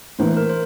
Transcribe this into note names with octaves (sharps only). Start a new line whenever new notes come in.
A2 E3 A#3 C5
A#4
C5